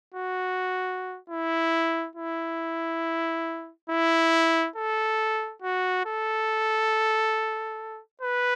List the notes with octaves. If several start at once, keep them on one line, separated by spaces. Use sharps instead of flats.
F#4
E4
E4
E4
A4
F#4
A4
B4